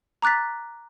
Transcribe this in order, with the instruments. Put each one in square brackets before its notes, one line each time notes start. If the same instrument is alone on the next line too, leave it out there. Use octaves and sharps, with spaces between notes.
[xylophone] A#5 D6 F#6 A6 B6